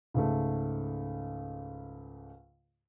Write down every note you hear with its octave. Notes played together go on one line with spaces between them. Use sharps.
C#2 G#2 A3